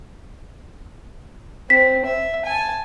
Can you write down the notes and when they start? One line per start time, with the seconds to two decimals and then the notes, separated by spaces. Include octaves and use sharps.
1.70 C4 B6
2.05 E5
2.45 G#5 A5